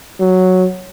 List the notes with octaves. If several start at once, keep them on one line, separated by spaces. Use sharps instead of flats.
F#3